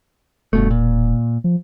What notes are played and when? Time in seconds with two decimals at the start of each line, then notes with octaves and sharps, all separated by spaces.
0.53 E1 G2 B2 A3
0.70 A#2
1.44 F3